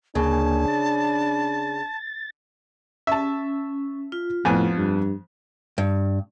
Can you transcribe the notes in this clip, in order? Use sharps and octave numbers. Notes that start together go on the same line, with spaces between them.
D2 C#3 A#3 D4 G#5 A5
A6
C#4 E5 A5
F4
F2 A2 B3 G#5
G2
G2